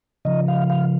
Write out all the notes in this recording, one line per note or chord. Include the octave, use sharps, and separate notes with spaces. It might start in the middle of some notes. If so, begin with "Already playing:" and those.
C#3 F3 D#5
F5
F5